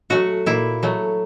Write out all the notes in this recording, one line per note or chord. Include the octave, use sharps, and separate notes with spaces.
F#3 A3 F#4
A#2 E4
F#3 A3